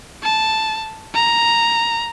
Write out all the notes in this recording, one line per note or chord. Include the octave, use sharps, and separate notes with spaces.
A5
A#5